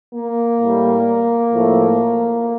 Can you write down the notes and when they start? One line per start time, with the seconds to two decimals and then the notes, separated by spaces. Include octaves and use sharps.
0.11 A#3
0.59 A2 G3
1.53 A2 F3 A3